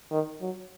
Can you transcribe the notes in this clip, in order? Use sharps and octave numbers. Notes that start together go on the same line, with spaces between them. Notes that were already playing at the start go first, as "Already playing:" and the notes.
D#3
F#3